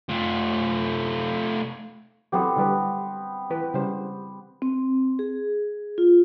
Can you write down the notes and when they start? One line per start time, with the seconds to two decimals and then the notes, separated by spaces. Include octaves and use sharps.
0.09 A3 F4
2.32 E3 F#3 B3 C4 G4 A4
2.56 D3 G3 B4
3.50 E3 B4
3.74 C#3 G3 C5
4.62 C4
5.19 G#4
5.98 F4